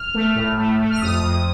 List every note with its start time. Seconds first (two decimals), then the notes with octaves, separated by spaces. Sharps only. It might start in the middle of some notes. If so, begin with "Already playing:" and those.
Already playing: F6
0.14 A3
0.35 A2
0.58 A3
0.80 A3
0.90 F6
1.02 F2 D#6
1.23 F2